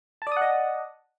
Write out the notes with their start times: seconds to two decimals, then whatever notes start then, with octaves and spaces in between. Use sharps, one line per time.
0.22 A5
0.27 D5
0.32 D#6
0.37 F#5
0.42 D#5